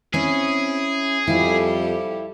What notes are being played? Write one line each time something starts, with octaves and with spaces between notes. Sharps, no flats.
C4 C#4 E4 G#4
F2 G3 E4 G4 A4 F5